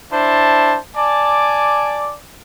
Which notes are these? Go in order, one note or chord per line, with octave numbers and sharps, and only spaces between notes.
D4 E4 C5 A5
D5 G#5 A5 D6